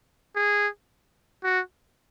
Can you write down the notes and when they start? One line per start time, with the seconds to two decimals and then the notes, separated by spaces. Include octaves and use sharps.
0.36 G#4
1.44 F#4